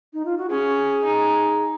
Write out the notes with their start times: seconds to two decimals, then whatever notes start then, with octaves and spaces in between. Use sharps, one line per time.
0.13 D#4
0.25 F4
0.38 F#4
0.50 C#4 G#4
1.05 D#4